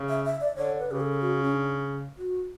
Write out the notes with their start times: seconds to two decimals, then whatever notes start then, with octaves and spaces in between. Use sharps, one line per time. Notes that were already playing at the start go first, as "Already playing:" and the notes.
Already playing: C#3
0.09 E5
0.25 E5
0.41 D5
0.57 D3 C#5
0.79 B4
0.89 C#3 G4
1.00 A4
1.21 F#4
1.43 C#4
1.53 D4
2.18 F#4